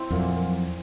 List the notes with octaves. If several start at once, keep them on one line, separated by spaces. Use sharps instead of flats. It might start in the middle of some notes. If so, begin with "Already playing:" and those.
Already playing: C4 E4
F2 A#2 F#3 A#3